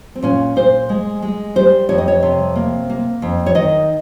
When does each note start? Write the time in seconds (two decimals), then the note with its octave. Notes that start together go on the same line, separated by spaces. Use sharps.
0.15 C4
0.23 A#2 C#4
0.56 A#2 C5
0.89 G#3
1.22 G#3
1.56 G3 C5
1.89 F2 C#5
1.98 D#5
2.08 C#5
2.23 C3
2.56 A#3
2.90 A#3
3.22 F2
3.46 C#5
3.55 D#3 D#5